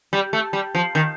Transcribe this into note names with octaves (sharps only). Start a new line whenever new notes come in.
G3
A3
G3
F3
D#3